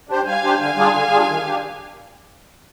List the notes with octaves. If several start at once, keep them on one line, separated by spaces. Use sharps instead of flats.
D4 G4 C5
G3 F5 G#5
D4 G4 C5
D3 F5 G#5
G3 D4 F4 G#4
D3
G3 D4 F4 G#4
D#3
D4 G4